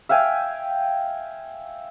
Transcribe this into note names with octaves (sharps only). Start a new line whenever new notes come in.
E5 F5 G5 G#5